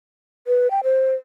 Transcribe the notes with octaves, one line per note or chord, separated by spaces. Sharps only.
B4
G5
C5